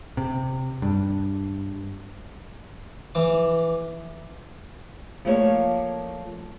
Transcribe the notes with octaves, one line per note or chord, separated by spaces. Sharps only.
C3
G2
E3 D6
F3 A3 A#3 A#4 C#5 D5